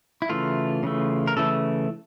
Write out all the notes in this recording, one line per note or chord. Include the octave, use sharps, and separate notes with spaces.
E4
C#3 E3 A3 F4
C#3 E3 A3
A#4
C#3 E3 A3 A4